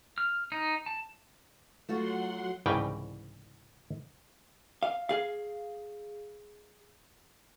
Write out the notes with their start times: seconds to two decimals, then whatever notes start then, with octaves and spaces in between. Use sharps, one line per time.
0.18 F6
0.52 D#4
0.86 A5
1.89 F#3 A3 F4 F#4 F#5 C6
2.66 C2 G#2 C#3 E3 G3 G5
4.83 F5
5.09 G#4 F5